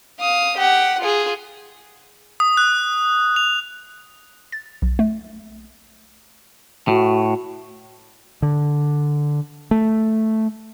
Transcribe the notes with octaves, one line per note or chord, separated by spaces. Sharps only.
F5 D#6
G4 F#5
F4 G#4
D#6
F#6
F7
A6
B1
A3
A2 F#4
D3
A3